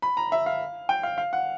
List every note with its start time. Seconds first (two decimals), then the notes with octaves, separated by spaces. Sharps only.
0.02 B5
0.17 A#5
0.32 E5
0.46 F5
0.89 G5
1.03 F5
1.18 F5
1.33 F#5